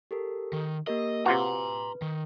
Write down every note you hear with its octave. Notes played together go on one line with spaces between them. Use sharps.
G4 A4 A#4
D#3
A#3 G4 A#4 D#5
C3 F4 F#4 B4 A#5 C6
D#3